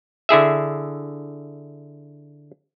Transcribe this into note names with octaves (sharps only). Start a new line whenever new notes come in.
D3 E4 G#4 E5